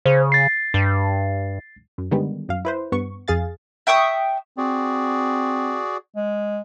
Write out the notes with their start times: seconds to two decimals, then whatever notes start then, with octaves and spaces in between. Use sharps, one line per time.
0.06 C#3 C5
0.32 A6 C7
0.74 G2
1.98 F#2
2.11 D3 D#3 G3 G#3 B3
2.49 F#2 F5
2.65 E4 B4 C5
2.92 G2 B3 C#6
3.28 F2 G#4 F5 A6
3.87 E5 G5 C#6 D#6
4.58 C4 F#4 G#4 D5
6.16 G#3